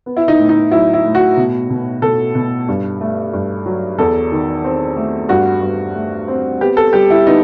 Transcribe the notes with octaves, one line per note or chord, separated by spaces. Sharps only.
B3
E4
D#4
A2
D#4
F#3 E4
E4
A2
F#4
B2
B2
B2 A4
B2
G2
A3
G2
F#3
E2 A4
D#3
C4
A3
G2 F#4
G2
A3
C4
B3 G4
A4
G3 G4
E4
B3 D#4